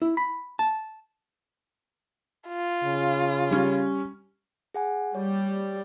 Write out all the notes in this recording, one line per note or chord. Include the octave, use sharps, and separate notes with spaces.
E4
B5
A5
F4
C#3
G3 C#4
G#4 F#5 G#5
G3 C#5